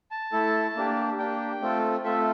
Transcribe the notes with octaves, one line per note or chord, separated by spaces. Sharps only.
A5
A3 E4 A4
A#3 D4 G4
A#3 D4 G4 G5
A3 C4 F4 A4
A3 C4 F4 A4 E5